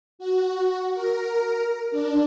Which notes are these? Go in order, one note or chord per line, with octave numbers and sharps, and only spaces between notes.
F#4
A#4
D4